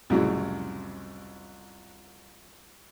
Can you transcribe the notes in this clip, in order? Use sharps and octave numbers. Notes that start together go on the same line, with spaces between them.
C2 F2 A2 C#3 F#3